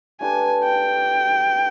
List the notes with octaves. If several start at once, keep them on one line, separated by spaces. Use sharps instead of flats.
A3 D4 G4 B4 G#5
G5